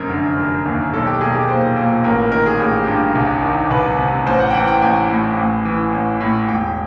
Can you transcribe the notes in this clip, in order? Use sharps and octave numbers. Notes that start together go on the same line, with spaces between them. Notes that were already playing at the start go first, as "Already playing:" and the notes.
Already playing: F1 F#2 A#4
D3
F1
D#2
B1 A4
G4
B1 G#4
G4
A#2 C5
A#2
A1 A#4
A#4
D#3 A#4
G#4
A1 G4
G2 G4
C2
D#3
C2 B4
C3
A1 C5
F#5
G5
E3 F#5
G5
A1 G#5
A2
A1
E3
A1
A2
E1 G5